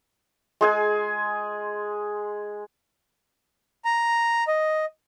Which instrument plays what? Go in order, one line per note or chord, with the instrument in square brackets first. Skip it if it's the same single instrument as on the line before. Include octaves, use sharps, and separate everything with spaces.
[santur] G#3 G#4 G#5
[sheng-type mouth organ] A#5
D#5